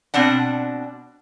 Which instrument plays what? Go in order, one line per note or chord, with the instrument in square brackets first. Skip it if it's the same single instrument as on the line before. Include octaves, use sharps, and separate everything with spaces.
[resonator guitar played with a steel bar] B2 C4 D4 F#5